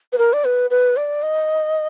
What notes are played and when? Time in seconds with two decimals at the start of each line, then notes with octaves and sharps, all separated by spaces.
0.13 B4
0.18 A#4
0.33 D5
0.45 B4
0.70 B4
0.97 D5
1.23 D#5